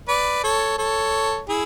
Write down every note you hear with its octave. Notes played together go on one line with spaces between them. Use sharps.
B4 D5
A4 C#5
A4 C#5
E4 G#4